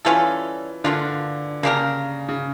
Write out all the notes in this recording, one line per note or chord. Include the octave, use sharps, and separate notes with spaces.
E3 G3 C#4 F4 A4
D3 A#3 D4 F4
C#3 A#3 D4 G4 A#4
C#3